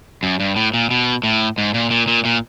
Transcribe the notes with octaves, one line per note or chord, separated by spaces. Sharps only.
F#2
G2
A2
A#2
B2
A2
G#2
A#2
A#2
A#2
A#2